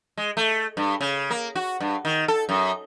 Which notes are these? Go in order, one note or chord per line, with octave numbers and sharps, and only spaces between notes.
G#3
A3
G2
C#3
A#3
F#4
G2
D#3
A4
F#2